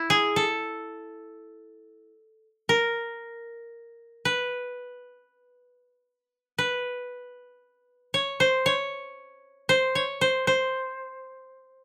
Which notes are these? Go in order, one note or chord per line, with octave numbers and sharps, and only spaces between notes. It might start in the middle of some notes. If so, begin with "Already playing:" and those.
Already playing: E4
G#4
A4
A#4
B4
B4
C#5
C5
C#5
C5
C#5
C5
C5